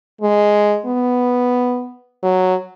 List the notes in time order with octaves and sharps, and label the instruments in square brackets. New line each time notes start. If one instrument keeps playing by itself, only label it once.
[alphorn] G#3
B3
F#3